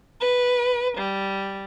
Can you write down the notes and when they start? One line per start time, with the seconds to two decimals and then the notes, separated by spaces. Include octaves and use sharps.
0.20 B4
0.98 G3